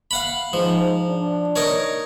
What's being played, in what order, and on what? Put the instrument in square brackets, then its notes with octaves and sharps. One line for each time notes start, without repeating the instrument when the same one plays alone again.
[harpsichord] F5 F#5 B5
[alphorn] G#2 [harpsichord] F3
[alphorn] D4
[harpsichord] D#4 A#4 C#5